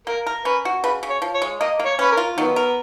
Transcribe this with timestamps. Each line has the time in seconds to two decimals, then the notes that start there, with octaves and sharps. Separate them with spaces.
0.07 A#3 A#4
0.27 A#4
0.45 C#4 B4
0.65 F#4
0.84 C#3 B4
1.03 C#3
1.10 C#5
1.22 F3
1.34 C#5
1.42 G#3
1.61 A#3 D#5
1.80 A#3
1.86 C#5
1.99 C#4 B4
2.12 A#4
2.17 F4
2.37 D#3 F#3 B3
2.56 A#4